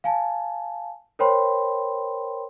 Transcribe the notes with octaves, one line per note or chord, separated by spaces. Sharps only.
F5 G#5 A5
A#4 C5 C#5 G5 B5 C6